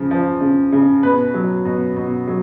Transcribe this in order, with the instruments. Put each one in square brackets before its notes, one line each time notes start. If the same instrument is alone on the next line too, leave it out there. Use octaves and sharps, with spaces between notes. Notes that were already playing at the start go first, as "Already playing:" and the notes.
Already playing: [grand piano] C#3 F3
F3
C#3
C#3
B2 B4
F#3
B2
B2
F#3